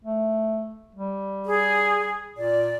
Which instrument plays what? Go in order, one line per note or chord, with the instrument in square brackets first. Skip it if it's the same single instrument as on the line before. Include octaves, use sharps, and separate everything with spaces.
[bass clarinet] A3
G3
[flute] G#4
[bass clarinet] A#2 [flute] D5